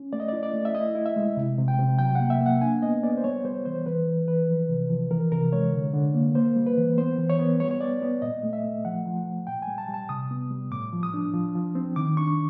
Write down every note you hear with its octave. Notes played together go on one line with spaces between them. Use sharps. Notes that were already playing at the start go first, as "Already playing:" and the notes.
Already playing: C#4
A3 D5
D#5
E4 D5
D5
A3
E5
E4 D#5
E4
E5
G#3
C3
C3
G5
C3
F#3 G5
A#3 F#5
E5
A#3
F#5
D4 G#5
B3 D#5
B3 D5
C5
G3 C#5
G3 C5
E3 C5
E3 B4
E3
E3 B4
F3
C3
F3
E3 A#4
C3 A#4
G#3 C#5
D3
D3
A#3
A#3 C5
G3
B4
E3
B3 C5
E3
C#5
B3
G3 C#5
C#5
B3 D5
B3
A#2 D#5
A3
E5
A3
F3 F#5
F3
F3
A#2 G5
G#5
G3
A5
G3
A5
C3 D#6
B3
G3
A2 D6
F3
D#6
D4
F3
F3
C4
D#3 D6
D4 C#6